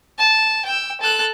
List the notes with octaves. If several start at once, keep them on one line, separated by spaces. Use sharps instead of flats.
A5
G5 E6
A4 F#6